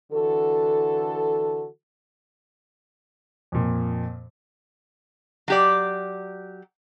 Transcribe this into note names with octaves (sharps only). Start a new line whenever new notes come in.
D3 E3 F#4 A4
F2 A#2
F#3 G4 D5